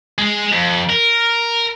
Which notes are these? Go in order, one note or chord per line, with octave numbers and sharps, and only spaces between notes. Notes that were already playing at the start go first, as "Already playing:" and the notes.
G#3
F2
A#4